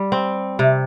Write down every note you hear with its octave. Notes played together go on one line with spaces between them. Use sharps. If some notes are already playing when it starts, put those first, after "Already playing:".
Already playing: G3
C4
C3